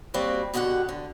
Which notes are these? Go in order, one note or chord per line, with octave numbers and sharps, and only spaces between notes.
G3 A#3 C4 F#4
B2 D3 F#4 G4 F#5
D3